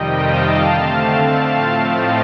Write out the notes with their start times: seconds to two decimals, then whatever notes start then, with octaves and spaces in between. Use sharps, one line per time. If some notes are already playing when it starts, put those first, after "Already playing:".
Already playing: F2 C3 D#3 G3 D#5 G5
0.19 F5 A5
0.62 D3 A3 C4
1.06 F5 A5
1.48 A2 F3 A3 C4
1.91 D#5 G5